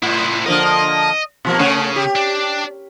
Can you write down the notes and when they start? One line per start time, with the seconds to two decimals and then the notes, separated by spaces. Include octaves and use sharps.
0.02 A2 E4 C5
0.46 D3 F3 A#3 D#5
1.45 B2 F3 A#3
1.60 C#3 A3 C#4 C#5
1.96 G4
2.15 D4